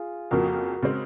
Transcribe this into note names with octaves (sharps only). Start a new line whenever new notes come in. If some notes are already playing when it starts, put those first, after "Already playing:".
Already playing: F4 G#4
F2 C#3 F3 A#3 F#4 A#4
C#3 G#3 C4